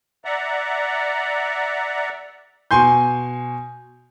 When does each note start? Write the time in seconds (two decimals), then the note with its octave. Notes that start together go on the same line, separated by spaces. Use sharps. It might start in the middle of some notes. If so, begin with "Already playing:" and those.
0.25 D5 E5 F#5 A#5
2.71 B2 G#5 C6 G6